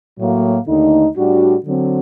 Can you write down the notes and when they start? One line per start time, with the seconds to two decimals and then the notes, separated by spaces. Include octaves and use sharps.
0.18 A2 F#3 A#3
0.67 D#2 D3 A3 D#4
1.17 A2 G3 D4 F#4
1.65 D3 F#3 C4